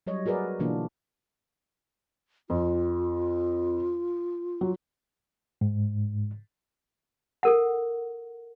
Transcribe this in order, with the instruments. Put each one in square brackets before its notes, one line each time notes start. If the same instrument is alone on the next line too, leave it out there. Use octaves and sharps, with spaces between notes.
[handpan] F#3 G3 C#5 D#5
F#4 G#4 A#4 B4 D5
B2 D3 E3 A#3 D4 F4
[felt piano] F2 [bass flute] F4
[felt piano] F#3
[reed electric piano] G#2
[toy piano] A4 A#4 F#5